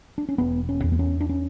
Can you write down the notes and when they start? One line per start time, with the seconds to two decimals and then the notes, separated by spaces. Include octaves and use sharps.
0.18 D4
0.29 C#4
0.38 E1 B3
0.69 C#4
0.84 E2
0.92 B3
0.99 C#4
1.21 D4
1.29 C#4